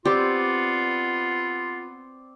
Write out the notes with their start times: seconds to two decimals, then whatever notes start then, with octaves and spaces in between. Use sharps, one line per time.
0.05 B3 C4 F4 G4 D5